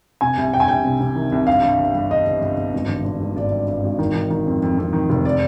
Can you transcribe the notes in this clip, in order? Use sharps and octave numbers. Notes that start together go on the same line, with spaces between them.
C3 G#5
C2
C2 G5
G#5
C2 G5
C3
C3
D#3
C2
G2 F5
G2
G1
G2
G1 D#5
G1
G1
G1
G#1
D3
D3
G#1
G#1 D5
G2
G2
G#1
D#3
D#3
D#3
F2
F2
F2
D#3
F1
D5